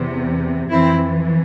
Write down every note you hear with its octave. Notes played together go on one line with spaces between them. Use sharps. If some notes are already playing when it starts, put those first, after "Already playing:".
Already playing: E2 C3 E3
F2 E3 C4 E4